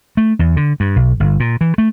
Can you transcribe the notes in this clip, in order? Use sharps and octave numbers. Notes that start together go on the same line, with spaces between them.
A3
E2
D3
G2
B1
G1
A#2
E3
A3